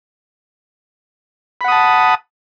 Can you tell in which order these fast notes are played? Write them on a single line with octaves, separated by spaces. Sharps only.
B5 F#5 D#6 A5